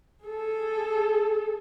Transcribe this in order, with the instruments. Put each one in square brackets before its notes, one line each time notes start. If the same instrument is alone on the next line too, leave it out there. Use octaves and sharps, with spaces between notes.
[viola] G#4 A4